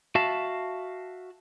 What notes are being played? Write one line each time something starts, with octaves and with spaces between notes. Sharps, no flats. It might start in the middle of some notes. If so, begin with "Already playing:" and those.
F#4 E5 F5 A5